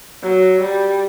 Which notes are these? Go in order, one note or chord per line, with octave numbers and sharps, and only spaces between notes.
F#3
G3